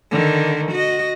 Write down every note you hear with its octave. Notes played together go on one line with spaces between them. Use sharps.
D3 D#3
F#4 D#5